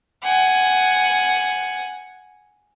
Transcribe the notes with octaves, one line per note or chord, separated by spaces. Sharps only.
F#5 G#5